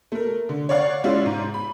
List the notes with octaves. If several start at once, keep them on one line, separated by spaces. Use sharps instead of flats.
A3 A#4
D3
C#5 D5 F5 F#5
G#3 C#4 E4 F4 D5
G#2
B5